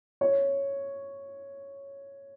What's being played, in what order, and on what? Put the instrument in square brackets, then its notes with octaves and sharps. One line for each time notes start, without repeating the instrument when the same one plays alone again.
[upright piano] C#5